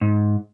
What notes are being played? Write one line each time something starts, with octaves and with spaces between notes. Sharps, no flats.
G#2